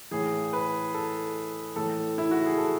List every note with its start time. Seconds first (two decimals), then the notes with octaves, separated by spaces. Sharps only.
0.11 A2 E3 G#4
0.53 B4
0.94 A4
1.76 A2 E3 A4
2.18 E4
2.31 F#4
2.45 G#4
2.58 A4